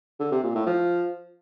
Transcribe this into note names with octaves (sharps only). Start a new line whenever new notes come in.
D3
C3
A#2
A2
F3